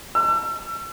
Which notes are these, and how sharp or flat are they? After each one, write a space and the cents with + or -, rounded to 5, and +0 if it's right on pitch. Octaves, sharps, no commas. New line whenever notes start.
E6 +40